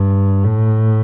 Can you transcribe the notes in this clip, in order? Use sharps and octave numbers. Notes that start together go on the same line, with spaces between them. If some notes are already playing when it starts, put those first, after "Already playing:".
Already playing: G2
A2